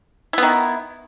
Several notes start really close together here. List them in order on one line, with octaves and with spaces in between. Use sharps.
E4 B3 D#3